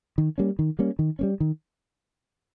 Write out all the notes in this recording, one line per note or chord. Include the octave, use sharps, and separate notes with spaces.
D#3
G3 A#3 C#4
D#3
G3 A#3 C#4
D#3
G3 A#3 C#4
D#3